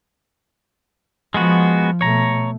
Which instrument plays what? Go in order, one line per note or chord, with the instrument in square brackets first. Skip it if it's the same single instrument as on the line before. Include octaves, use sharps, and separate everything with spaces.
[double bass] F3 [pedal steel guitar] G#3 B3 F#4
[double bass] B2 A3 [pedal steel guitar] C#5 A#5